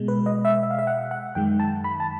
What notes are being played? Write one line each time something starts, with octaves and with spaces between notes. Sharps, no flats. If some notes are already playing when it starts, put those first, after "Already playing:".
Already playing: B2 G#3
B4
D#5
E5
E5
F5
E5
F#5
F#5
F#2 D#3 G#3 G5
A5
B5
A5